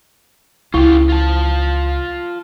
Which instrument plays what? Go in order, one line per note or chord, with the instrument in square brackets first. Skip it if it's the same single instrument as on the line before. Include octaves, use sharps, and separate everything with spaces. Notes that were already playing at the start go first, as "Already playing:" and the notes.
[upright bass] C#2 [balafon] E4 [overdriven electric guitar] F4 G4
[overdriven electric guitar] F4 A5